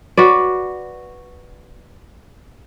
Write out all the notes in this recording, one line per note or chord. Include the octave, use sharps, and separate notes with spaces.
F#4 B4 D5